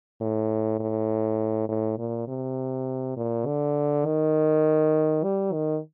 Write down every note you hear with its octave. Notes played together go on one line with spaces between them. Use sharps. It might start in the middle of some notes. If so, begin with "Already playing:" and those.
A2
A2
A2
A#2
C3
A#2
D3
D#3
G3
D#3